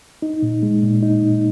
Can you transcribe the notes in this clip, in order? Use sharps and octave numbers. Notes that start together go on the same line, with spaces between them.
D#4
A#2
G#3
A#2
D#4
A#2